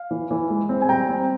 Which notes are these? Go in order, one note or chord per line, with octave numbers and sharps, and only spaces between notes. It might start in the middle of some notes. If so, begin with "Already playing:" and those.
Already playing: F5
E3
E3
G#3
C4
G#5
G3 G5 A#5
C4